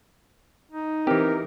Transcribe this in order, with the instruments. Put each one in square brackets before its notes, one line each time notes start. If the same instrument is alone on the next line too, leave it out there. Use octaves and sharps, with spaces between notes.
[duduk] D#4
[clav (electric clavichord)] E3 G4 [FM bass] C4 [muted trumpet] A#4